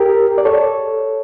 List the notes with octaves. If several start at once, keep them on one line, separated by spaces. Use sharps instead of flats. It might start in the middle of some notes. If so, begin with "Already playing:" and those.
Already playing: G4 A#4
D5
A4 C#5